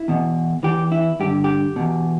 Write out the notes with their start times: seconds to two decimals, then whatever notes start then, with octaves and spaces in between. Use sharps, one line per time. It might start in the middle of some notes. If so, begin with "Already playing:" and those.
Already playing: E4
0.08 E2 B2
0.63 E2 E3 G4
0.92 E4
1.20 G2 D3 G4
1.44 G4
1.76 E2 B2